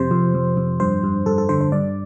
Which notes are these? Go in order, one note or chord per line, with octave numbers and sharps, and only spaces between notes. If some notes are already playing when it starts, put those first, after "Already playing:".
Already playing: F2 C3 C5
F2
F2
F2
G2 C5
G2
G2 A4
A4
D3 C5
C5
G2 D5